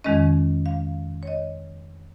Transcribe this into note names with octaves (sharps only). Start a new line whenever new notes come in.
F2 D#3 G#3 C#4 D#5
F5
C#5
D#5